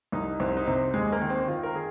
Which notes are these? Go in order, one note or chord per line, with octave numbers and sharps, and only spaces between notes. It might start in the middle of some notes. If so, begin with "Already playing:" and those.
C2 D#4
C2 C4
D#4
C3 C4
D#2 G#3
A#3
D#3
C4
D#3 F4
A#4
G#4